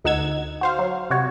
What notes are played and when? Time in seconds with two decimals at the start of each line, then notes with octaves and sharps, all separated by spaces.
0.04 D2 D#4 F#5 E6 G#6
0.61 F#4 C5 F5
0.79 F#3
1.10 C3 F#4 C#5